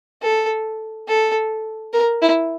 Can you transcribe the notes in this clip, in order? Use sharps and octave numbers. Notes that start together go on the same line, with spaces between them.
A4
A4
A#4
E4